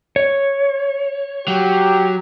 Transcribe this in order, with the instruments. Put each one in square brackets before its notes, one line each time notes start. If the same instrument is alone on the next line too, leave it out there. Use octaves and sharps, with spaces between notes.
[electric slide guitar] C#5
[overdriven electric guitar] F#3 [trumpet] G4